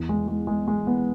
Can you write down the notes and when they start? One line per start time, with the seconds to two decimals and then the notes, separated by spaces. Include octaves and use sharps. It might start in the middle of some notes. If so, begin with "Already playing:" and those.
Already playing: E2
0.09 G#3
0.28 G#3
0.47 G#3
0.68 G#3
0.87 B3